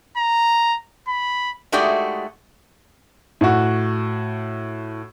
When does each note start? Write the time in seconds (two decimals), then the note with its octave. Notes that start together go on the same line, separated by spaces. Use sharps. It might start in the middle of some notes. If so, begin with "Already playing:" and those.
0.17 A#5
1.08 B5
1.72 G#3 A3 D#4 F#4 G4 D5
3.41 A2 F#4